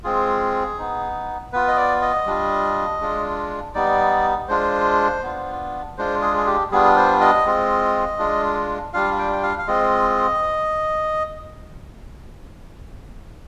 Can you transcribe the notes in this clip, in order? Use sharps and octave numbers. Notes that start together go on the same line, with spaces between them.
G#3 C4 F4 G#4
B3 D#4
B3 F4 B4
D#5
D5
D#5
G3 D4 F4
G#3 D4 F4
G3 B3 D#4 D5
G#3 D4 F4 C5
B3 D4 F4
G#3 D4 F4 C5
G#4
G#4
G4
G3 B3 D4 F4 G#4
C5
D#5
G#3 C4 F4
G#3 D4 F4
G3 D4 F4 F5
G5
G5
F5
F5
G#3 C4 F4 D#5